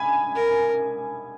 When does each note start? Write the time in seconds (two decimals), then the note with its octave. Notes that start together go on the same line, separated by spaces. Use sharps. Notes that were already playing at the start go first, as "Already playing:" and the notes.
Already playing: G#5 B5
0.35 A#4